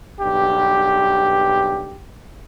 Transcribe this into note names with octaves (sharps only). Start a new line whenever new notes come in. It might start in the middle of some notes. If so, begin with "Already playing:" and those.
B1 G2 G4